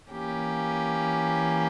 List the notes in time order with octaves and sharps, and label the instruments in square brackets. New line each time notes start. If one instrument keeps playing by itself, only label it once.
[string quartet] E3 A#3 C#4 G4